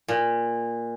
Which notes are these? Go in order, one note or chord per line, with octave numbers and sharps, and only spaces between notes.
A#2